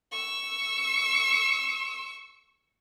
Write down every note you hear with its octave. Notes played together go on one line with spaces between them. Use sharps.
C#6 E6